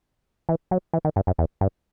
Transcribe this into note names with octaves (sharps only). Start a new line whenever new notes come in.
E3
F#3
E3
D#3
G2
F#2
E2
G2